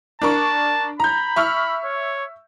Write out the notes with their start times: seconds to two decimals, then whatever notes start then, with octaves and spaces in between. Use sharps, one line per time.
0.22 D4 A#4 A5 C#6
1.00 A#5 B5 G6
1.36 E5 C#6 F6
1.85 C#5